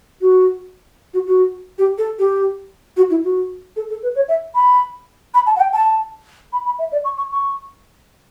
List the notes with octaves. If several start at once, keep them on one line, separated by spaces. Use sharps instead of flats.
F#4
F#4
F#4
G4
A4
G4
F#4
E4
F#4
A4
A4
B4
C#5
E5
B5
B5
A5
F#5
G5
A5
B5
B5
E5
D5
C#6
C#6
C#6